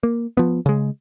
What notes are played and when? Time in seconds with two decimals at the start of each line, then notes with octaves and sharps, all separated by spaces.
0.03 A#3
0.37 F3 B3
0.66 C#3 G#3